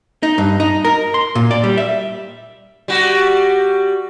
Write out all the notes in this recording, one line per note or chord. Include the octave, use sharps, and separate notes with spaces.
D#4
G2
D#4
A#4
C6
A#2
D5
G3
E5
G3 F#4